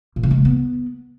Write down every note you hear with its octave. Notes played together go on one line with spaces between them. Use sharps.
A#2
C#3
G#3
C#4
B3